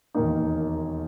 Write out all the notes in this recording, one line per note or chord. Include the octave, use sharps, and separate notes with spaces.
E1 D#2 D#3 A#3 D#4